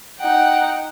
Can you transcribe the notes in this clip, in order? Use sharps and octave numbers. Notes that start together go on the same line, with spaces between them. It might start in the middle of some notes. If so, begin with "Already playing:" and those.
D#4 F#5 G5